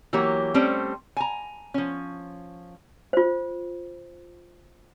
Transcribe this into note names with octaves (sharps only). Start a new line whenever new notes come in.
E3 F#3 A#3 G4 C#5
G3 A3 C4 C#4 C5
G#5 A#5
F3 C#4
F4 C5